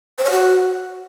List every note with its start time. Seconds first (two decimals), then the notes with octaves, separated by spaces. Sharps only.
0.18 C5
0.24 C#5
0.30 F#4